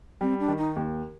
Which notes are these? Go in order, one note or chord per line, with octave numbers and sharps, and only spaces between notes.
G3 C4
D4
D#3
D#4
D#2